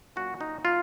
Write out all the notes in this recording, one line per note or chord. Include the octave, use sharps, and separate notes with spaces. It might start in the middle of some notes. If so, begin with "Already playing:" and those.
A#2 F#3 C#4 F#4
D#4
F4